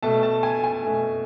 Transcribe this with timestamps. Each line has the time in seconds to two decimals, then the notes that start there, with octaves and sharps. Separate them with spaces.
0.03 B2 A3 A5
0.23 A5
0.43 G#5
0.64 G#5
0.84 B2 A3